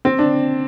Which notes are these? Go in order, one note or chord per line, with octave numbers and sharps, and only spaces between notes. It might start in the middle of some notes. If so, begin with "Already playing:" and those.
C4
D4